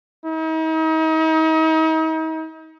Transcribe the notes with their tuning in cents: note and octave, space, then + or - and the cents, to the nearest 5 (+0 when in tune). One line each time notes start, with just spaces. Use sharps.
D#4 +40